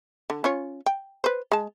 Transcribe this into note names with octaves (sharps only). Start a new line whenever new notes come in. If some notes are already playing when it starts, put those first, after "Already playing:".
D3
C#4 F4 C#5
G5
B4 C5
G#3 A5